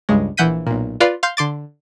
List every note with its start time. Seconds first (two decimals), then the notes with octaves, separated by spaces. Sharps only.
0.09 C#2 G2 G#3
0.37 A#1 E3 F#5 G6 B6 D#7
0.67 B1 A#2
1.00 F4 B4 D5 F5 C6
1.23 F5 C6 G6
1.37 D3 C6 D6 A6